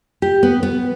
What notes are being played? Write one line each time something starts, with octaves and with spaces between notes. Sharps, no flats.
G4
B3
B3